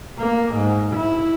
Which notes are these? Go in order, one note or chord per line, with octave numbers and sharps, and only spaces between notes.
A#3
G#2
E4